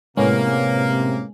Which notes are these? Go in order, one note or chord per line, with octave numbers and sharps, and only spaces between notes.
A2 C3 G#3 A#3 B3 C#4